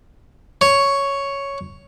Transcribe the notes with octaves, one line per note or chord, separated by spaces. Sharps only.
C#5